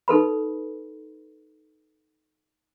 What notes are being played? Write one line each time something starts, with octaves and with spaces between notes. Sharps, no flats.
D#4 A4 B4 B5